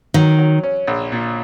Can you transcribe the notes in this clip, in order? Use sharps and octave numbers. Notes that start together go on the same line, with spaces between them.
D#3 F#3
F#3
C#4
A#1
A#2